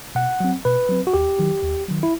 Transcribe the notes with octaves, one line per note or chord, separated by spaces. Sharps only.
B2 F#5
F#3 C4
B2 B4
F#3 C4
F#4
D#2 G4
D#3 F#3
D#2
D#3 F#3
E4